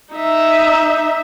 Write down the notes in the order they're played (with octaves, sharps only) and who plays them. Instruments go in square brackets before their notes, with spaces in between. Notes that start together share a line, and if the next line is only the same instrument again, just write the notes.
[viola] D#4 E5